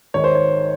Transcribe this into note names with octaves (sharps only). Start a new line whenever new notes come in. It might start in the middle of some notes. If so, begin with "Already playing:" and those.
G#1 G#2 D#3 C#5
C5
C#5